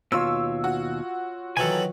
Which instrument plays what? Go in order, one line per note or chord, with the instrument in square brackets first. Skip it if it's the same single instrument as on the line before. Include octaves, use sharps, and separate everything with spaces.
[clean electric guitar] D#2 B2 [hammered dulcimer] F4 C#5 [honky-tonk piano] E6
[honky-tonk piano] F#4
[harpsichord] D#3 E3 F#3 [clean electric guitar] A4 G#5